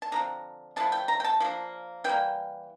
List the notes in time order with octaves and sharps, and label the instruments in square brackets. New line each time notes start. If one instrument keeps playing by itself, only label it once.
[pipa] A5
D3 F3 C4 A#5
D3 F3 A3 E4 A5
G5
A#5
G5
A5
F3 A#3 D4
E3 G3 A#3 G5